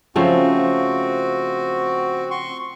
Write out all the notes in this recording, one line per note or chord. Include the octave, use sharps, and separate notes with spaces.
C#3 F3 A3 C4 F#4
C6 C#6